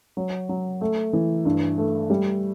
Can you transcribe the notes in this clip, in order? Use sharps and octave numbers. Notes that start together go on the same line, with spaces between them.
F#3
F#3
A3
E3
G2
A3
G3